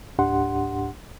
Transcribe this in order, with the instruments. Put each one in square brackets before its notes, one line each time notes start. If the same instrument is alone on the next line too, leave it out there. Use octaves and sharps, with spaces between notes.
[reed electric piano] C#2 G#2 D4 G4 F#5 C6